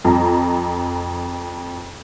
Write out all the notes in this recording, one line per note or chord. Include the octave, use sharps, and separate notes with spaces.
F2 A#5